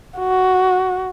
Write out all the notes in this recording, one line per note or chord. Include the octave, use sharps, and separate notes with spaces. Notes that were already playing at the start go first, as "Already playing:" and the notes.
F#4